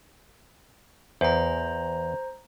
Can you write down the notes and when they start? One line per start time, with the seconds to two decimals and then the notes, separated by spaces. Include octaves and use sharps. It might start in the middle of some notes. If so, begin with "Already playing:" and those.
1.21 E2 C5 A#5